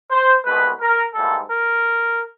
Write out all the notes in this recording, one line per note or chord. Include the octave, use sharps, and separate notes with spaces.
C5
C2 B2 G#3 B4
A#4
G#2 E3 G3 A#3 A4
A#4